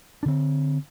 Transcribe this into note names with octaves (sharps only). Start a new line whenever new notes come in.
D3 C4 D4